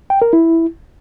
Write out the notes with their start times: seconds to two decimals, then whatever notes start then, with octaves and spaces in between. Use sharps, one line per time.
0.10 G5
0.22 A#4
0.33 E4